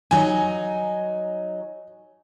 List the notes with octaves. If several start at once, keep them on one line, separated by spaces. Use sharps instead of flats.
F#3 D#4 G#5